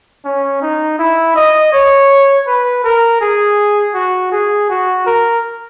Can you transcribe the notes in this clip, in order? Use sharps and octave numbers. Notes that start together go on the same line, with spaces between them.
C#4
D#4
E4
D#5
C#5
B4
A#4
G#4
F#4
G#4
F#4
A#4